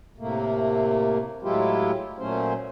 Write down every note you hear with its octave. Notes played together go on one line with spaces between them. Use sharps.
A2 C3 A3 A#3
A2 F#3 G#3 E4 F4 G4
A#2 F#3 A3 C#4 C5